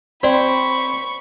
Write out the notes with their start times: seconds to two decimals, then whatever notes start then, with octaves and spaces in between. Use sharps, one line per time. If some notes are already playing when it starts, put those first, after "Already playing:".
0.23 C4 F#4 D5 B5 C#6